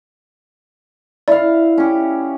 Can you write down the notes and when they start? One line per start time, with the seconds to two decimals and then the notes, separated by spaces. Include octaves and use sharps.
1.28 E4 D5 F5
1.78 C#4 G4